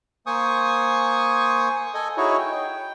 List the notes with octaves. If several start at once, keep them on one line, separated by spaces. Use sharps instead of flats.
A#3 C5 G#5 C#6 D#6
A4 D#5 G#5
D#4 E4 F#4 G#4 C#5
G5